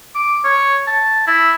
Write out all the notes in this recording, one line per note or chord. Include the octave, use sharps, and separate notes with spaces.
D6
C#5
A5
E4